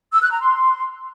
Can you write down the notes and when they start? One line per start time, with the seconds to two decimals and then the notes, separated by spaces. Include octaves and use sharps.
0.13 E6
0.22 F#6
0.32 A#5
0.41 C6